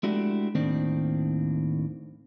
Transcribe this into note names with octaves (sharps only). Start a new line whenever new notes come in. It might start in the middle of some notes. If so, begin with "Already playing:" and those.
G#3 A3 D4 E4 F#4 G4
D#2 A2 D#3 C4 D4